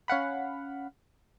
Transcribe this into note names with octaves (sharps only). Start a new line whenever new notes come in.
C#4 F5 F#5 B5